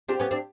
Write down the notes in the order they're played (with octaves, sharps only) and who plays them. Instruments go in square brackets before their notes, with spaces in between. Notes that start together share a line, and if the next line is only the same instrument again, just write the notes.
[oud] C4 D4 [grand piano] G4
[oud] B3 C#4
C4 D4